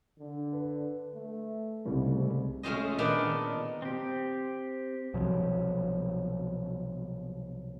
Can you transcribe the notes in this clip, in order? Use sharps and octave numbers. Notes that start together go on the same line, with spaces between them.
D3
B4
A3
C2 G#2 C#3 G3 A3 C4
G#3 A3 C#4 F4 C5 D#5
A#2 D#3 B3 D4 D#4
C4 G4
C2 B2 F3 F#3